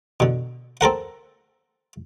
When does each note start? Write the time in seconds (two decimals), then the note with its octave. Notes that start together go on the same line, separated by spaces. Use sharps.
0.20 B2 D3
0.81 C4 A4 A#4 F#5